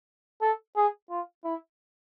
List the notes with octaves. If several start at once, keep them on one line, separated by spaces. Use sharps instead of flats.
A4
G#4
F4
E4